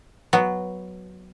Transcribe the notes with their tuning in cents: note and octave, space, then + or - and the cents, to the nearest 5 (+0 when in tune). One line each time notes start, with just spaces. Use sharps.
F#3 +0 B3 +0